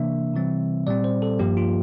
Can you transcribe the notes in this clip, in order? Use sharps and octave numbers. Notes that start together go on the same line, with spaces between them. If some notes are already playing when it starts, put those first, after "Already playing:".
Already playing: C3 E3 A#3 D4 E5
C3 E3 G3 C4
A#2 G3 C4 D5
C5
A4
G2 F3 A#3 G4
F4